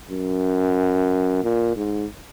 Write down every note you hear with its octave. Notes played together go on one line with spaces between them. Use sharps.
F#2
A#2
G#2